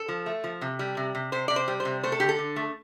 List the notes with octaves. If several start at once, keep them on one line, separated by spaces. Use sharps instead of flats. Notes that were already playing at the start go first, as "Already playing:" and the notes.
Already playing: A4
F3
A3
F3
C3
G3
C3
C3
C3 C5
C3 D5
C5
G3
C5
C3
A3 C5
A4
D3 G4
A4
D3
A3